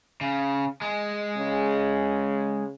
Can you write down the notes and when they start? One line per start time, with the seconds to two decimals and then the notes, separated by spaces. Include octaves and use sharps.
0.21 C#3
0.81 G#3
1.38 C#3